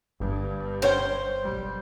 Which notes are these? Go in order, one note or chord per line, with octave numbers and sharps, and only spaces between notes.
G1 G2
C#4 C5 C#5 G5
B1 G3